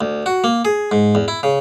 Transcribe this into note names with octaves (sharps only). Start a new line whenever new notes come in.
D2
F#4
A#3
G#4
G#2
E2
E4
C#3